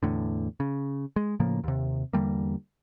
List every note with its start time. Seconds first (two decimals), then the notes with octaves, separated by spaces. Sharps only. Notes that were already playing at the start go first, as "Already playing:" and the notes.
0.03 E2 A2 D3
0.60 C#3
1.16 G#3
1.40 A2 C#3 F3 A#3
1.64 D#2 C3
2.13 E2 D3 G3 A#3